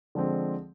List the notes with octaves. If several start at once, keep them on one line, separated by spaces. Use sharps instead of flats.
D3 F3 G#3 C4